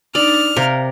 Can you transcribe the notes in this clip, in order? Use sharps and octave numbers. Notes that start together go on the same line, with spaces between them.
D4 D#4 D5 F6
C3 A#4 F5